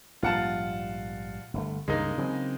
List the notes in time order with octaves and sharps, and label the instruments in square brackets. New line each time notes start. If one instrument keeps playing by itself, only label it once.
[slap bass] A#1 G#2 G3 [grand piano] F4 F#5 A5
[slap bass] G1 D3 A3
[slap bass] C#2 G2 C#3 [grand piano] G#3 A#3 D#4
[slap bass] C#3 F#3 C4